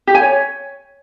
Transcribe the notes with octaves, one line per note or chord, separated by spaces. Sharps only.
G4
G#5
C#5